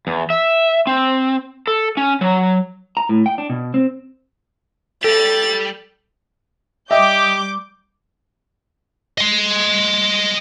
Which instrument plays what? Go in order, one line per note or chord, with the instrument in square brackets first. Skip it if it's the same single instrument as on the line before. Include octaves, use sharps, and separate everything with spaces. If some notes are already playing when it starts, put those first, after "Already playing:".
[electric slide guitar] E2
E5
C4
A4
C#4
F#3
A#5
A2
G5
D4
B2
C4
[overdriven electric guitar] G3 G4 [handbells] A4 [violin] A6
[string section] G3 D6 G6 [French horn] G4 [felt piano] D#5 [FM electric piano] E5 G5 D#6
[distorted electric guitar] D#5 C6